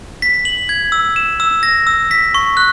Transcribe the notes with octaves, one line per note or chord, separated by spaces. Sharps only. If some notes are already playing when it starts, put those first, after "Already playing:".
B6
F#7
G#6
E6
E7
E6
A#6
E6
B6
C#6
F#6